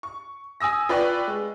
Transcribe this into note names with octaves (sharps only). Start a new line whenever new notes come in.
C#6
G#5 D#6 E6 A#6
F4 B4 D5 G5 C#6
G#3